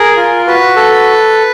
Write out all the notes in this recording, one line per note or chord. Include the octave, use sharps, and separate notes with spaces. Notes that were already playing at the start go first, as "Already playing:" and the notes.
Already playing: G#4 A#4
F4
F#4 B4
A4